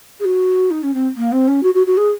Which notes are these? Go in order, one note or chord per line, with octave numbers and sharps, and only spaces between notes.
G#4
F#4
D#4
C#4
C4
A#3
C4
C#4
F#4
F#4
F#4
G#4